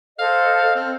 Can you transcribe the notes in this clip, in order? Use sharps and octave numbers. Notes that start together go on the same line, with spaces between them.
A4 C5 D#5 F5
C4